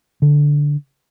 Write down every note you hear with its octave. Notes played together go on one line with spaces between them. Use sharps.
D3